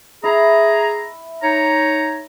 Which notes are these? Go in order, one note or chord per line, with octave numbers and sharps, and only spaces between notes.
E4 G#4 A#5
D#4 C#5 A#5